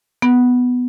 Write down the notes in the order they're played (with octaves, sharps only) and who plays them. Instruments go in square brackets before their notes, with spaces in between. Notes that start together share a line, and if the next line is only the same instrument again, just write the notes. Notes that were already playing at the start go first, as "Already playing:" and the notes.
[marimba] B3